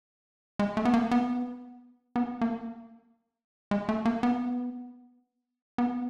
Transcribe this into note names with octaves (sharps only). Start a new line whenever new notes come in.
G#3
A3
B3
A#3
B3
B3
A#3
G#3
A3
A#3
B3
B3